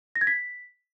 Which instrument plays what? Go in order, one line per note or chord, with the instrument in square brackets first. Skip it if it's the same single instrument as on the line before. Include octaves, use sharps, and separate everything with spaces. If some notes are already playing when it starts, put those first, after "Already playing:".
[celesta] A#6
G#6
B6